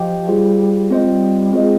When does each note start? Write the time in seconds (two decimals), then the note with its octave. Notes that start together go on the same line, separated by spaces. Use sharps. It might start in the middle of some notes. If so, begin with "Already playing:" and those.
Already playing: F3 G4 D#5 G5
0.28 G3 F4 G#4 C5
0.90 G#3 C4 F4 C5 D#5
1.06 G3
1.53 G#3 C4 F4 C5 D#5